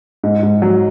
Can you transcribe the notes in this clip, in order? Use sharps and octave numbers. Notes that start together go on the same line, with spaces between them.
G#2
G#2
F#3